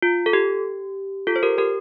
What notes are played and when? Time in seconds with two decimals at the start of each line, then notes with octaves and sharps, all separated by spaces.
0.02 F4
0.26 A4
0.33 G4
1.27 F4 A4
1.36 C5
1.42 G4 A#4
1.58 G4 A#4